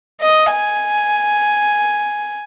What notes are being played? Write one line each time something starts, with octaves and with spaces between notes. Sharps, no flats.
D#5
G#5